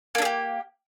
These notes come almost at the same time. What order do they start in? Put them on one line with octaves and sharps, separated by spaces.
A#3 D4 G#4 G4